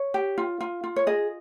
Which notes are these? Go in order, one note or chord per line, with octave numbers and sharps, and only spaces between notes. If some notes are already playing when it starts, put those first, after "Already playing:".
Already playing: C#5
G4
F4
F4
F4
C#5
G#4 D#5